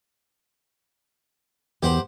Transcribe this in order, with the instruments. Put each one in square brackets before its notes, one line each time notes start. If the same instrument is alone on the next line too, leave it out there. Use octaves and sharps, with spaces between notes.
[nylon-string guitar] E2 A#4 [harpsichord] G4 C5 F#5